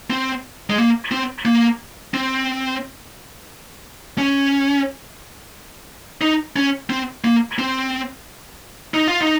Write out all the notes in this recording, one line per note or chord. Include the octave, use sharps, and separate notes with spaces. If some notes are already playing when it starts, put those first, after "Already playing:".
C4
G#3
A#3
C4
A#3
C4
C#4
D#4
C#4
C4
A#3
C4
D#4
F4
D#4